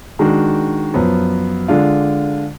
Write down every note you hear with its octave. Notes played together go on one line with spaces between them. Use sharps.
D#3 G#3 D4 F#4
F#2 F3 B3
D3 G#3 D4 F4